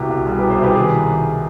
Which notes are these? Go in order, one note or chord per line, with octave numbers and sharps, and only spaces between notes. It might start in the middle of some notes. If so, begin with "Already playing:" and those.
Already playing: C2 B2 G4
C2
G3 G#4
B2 G4 B4
G#4 C5
C2 G4 B4
D#3 G#4